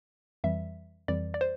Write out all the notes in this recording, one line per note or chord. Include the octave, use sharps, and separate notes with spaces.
F2 E3 G3 E5
F2 E3 G3 D5
D5
C5